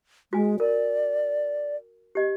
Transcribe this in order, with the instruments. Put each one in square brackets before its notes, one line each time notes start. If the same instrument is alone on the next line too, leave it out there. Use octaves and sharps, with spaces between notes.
[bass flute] G#3 [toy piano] F#4 G#5
[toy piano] A#4 [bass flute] D5
[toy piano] G4 D#5